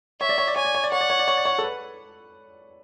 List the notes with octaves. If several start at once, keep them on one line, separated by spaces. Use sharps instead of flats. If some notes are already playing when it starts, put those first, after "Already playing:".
C#5 E5
D5
C#5
D5
C#5 G#5
D5
C#5
D5
C#5 F#5
D5
C#5
D5
C#5
D5
C#5
A4
B4